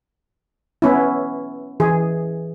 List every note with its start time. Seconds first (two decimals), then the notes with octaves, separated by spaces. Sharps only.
0.82 B3 C#4 E4
1.80 E3 G#4